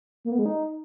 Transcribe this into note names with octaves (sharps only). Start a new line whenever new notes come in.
A#3
B3
G#3
D#4